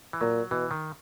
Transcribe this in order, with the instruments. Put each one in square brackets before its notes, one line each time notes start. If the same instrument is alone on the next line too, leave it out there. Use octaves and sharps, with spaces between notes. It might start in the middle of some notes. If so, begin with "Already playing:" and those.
[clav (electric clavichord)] E3
[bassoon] A#2 [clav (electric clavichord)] F#3
[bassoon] B2 [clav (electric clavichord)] E3
[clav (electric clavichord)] D#3